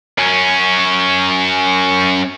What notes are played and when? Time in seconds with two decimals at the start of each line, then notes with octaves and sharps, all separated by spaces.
0.18 F#2 C#4